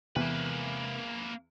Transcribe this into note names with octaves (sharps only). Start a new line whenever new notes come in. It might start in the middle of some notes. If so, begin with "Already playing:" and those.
E2 C3 G#3 A#3 B4